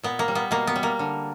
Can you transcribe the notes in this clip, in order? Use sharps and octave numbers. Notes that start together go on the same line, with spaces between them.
A#2 B3
A#3
G3
B3
B2 A#3
B3
G3
A#3
D3